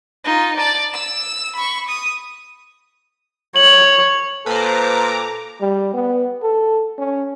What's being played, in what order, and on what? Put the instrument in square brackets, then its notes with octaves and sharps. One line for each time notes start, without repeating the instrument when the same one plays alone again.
[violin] D#4 F4
D5 A5
E6 E7
B5 C#6
D#6
[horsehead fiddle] C#5 [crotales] F#7
[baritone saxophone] A#2 [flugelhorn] A4 [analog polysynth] B4 C5 [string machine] A#5 D6
[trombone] G3
B3
A4
C#4